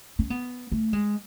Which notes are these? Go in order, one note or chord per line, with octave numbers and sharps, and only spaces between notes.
C#4
B3
A3
G#3